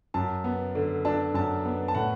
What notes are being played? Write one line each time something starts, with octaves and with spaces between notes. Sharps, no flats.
F#2 A5
B3
D3
D4 A5
F#2 A5
B3
A5
A2 F#5